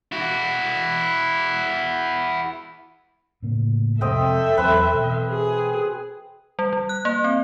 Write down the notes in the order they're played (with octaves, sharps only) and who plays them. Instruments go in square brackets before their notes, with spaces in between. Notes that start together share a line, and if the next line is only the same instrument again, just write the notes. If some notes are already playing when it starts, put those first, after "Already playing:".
[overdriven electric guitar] E4 F#4
[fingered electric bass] A2 C#3 A#3
[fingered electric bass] F2 C3 G#3 [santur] C4 D#5 G5 [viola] A4 E5
[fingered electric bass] E2 F#3 [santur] C4 B4
[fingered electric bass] B2 E3
[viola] G#4
[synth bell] G3
G3
F#6
A#3
C4